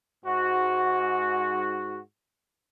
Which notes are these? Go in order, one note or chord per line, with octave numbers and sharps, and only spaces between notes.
G#2 F#4